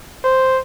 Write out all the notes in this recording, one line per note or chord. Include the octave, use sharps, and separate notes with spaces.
C5